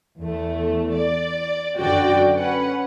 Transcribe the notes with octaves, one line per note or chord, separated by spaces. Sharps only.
E2 A3
D5
F#2 D3 F#4 D5 G5
C#4 B4 F#5